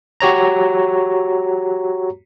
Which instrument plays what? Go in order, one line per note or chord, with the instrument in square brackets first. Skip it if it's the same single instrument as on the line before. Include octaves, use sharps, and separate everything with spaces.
[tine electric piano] F#4 G4 C#5 A#5